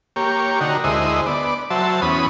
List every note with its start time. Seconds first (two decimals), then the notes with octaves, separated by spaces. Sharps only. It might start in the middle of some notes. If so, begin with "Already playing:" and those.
0.16 A#3 G4 C#5
0.61 D3 D#4 F#4 A#4
0.84 D2 G#3 E4 C5 D#5
1.26 B3 D5
1.70 F#3 C5 E5 A5
2.02 E2 B3 C#4 B5 D#6